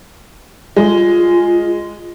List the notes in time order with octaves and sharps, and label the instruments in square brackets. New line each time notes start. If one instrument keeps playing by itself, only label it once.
[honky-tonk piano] G#3 [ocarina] F4